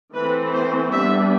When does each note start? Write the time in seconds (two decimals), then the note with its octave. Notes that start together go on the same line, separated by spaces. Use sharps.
0.15 E3 A3 C4 B4
0.53 C5
0.91 G3 B3 D4 E5